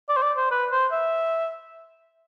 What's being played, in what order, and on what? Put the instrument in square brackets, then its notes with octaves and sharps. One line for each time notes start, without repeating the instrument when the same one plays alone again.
[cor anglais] D5
C5
D5
C5
B4
C5
E5